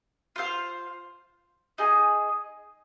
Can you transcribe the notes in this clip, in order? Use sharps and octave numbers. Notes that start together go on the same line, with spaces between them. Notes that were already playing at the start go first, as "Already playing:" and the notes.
F4 C5 F5
D#4 G#4 D#5 G#5